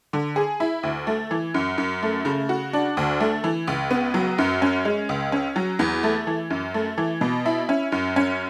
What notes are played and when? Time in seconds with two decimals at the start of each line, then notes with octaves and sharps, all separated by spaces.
0.13 D3
0.36 G#4
0.60 E4
0.83 D2
1.07 A3
1.31 E3
1.54 F#2
1.78 F#2
2.03 A3
2.25 C#3
2.49 F#4
2.73 D4
2.97 D2
3.20 A3
3.44 E3
3.68 C#2
3.91 B3
4.14 F#3
4.38 F#2
4.62 C#4
4.85 G#3
5.09 C#2
5.32 C#4
5.56 F#3
5.79 E2
6.03 A3
6.27 E3
6.50 F#2
6.74 A3
6.98 E3
7.21 B2
7.46 E4
7.69 C#4
7.92 F#2
8.16 C#4